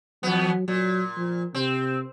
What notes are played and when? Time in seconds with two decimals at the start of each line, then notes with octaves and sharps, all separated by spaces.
0.23 E2 F#3 B3
0.68 A#2 F#3
1.17 F3
1.55 C3 C4